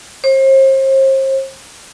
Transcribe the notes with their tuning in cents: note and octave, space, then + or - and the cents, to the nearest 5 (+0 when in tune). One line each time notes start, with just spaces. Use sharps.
C5 +40